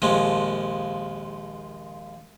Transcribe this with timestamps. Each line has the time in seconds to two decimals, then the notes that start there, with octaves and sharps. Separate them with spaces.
0.02 A#1 D#2 F3 G#3